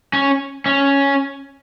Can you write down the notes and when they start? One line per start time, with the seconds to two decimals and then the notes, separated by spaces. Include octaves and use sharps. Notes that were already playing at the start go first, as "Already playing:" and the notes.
0.13 C#4
0.66 C#4